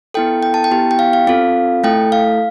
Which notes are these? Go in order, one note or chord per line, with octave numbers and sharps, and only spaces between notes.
B3 E4 A4 G5
G5
A5
G5
B3 E4 G4
G5
F5
F5
C4 F4 A4 F5
A3 E4 A4 G5
F5